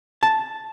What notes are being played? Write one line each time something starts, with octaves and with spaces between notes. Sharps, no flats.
A5